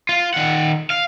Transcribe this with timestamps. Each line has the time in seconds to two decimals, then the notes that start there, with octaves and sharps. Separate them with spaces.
0.09 F4
0.34 D#3 F#5
0.90 F5